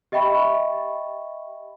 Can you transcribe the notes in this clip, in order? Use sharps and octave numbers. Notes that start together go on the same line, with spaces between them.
G4 D#5 E5 G5 B5 C#6